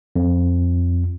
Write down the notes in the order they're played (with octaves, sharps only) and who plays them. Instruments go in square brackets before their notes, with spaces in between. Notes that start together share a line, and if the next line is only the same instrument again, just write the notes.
[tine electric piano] F2